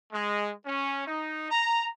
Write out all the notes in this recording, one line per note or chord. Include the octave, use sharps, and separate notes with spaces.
G#3
C#4
D#4
A#5